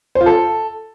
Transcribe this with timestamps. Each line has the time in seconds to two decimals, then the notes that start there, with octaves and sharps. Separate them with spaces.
0.15 C5
0.21 F4
0.26 A4